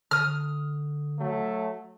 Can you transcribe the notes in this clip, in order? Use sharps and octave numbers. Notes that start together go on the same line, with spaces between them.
D3 D#6 F6
F#3 A3